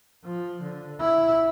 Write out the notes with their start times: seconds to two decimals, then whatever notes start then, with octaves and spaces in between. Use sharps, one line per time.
0.24 F3
0.62 D3
1.00 E4